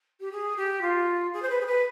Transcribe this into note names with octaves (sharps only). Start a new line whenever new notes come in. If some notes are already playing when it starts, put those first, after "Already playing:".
G4
G#4
G4
F4
G#4
C5
B4
G#4
B4